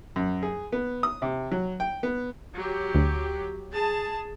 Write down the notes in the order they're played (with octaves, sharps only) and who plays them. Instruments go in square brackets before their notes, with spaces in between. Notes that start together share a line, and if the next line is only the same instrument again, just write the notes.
[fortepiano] F#2
G#4
B3
D#6
C3
F#3
G5
B3
[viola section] F#3 G4
[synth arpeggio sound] D2
[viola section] G#4 A5